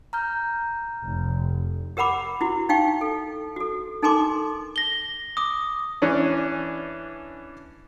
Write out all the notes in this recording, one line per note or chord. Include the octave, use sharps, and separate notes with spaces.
A#5 F6 G6
F1
G4 A#4 F#5 B5 D6
E4 F#4
D#4 F5 G5 C#6
A4
F#4 A4
D#4 A4 A#4 G#5 C6 D6
A#6 G7
D6 D#6
E3 C#4 D4